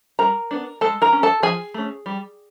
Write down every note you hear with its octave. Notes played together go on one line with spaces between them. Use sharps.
G3 A#4 A#5
B3 D4
G#3 A4 A5
A#4 A#5
C#4
A4 A5
F3 G#4 G#5
A3 C#4
G3